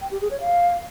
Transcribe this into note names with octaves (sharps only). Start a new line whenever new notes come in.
G5
G4
G#4
C#5
F5